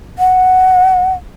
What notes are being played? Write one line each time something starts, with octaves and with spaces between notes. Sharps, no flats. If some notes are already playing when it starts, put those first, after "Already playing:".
F#5